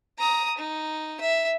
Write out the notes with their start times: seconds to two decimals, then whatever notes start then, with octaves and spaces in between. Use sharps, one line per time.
0.19 A#5 D#6
0.58 D#4
1.21 E5